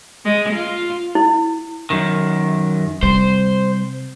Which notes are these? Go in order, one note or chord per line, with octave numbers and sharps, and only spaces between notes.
G#3
F4
E4
F#2 D#3
C3 G3 C5